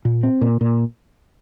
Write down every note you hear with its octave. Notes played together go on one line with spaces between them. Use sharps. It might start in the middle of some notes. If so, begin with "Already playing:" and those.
A#2
C4
A#2
A#2